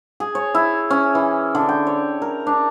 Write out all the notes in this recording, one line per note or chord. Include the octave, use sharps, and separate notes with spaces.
G#4
C#5
E4
C#4
E3
D3
G5
C#5
A#4
D4